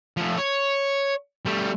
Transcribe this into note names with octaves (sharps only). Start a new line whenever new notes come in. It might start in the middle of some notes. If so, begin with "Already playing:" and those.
F3 A3
C#5
G3 A3